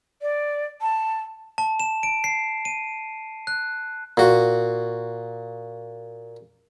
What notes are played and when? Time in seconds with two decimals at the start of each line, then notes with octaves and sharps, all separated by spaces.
0.22 D5
0.81 A5
1.58 A5
1.80 E7
2.03 D7
2.24 C7
2.65 D#7
3.47 F#6
4.17 A#2 F#4